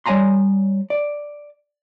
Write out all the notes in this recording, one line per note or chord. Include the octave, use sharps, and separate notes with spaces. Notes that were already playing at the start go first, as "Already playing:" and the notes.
G3 C#5 E5 G#5 A#5 C6
D5